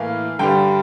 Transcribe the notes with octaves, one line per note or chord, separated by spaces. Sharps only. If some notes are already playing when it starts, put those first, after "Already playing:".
Already playing: A2 E3 A#3 F5
G2 D3 G3 G5